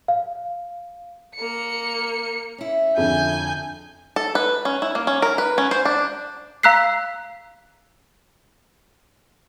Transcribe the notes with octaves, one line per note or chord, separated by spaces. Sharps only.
F5
A#3 C#7
C#4 E4
F2 D3 G#5 G6
A4
B4
C#4
E4
A#3
C#4
A#4
B4
C#4
C5
D4
F5 A#5 E6 F#6 B6 C7